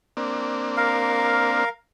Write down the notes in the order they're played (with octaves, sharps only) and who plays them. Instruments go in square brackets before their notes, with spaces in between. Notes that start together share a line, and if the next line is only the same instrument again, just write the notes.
[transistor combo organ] A#3 C4 D4
[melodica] A#4 F5